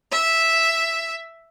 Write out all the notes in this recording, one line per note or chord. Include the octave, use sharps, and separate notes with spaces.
E5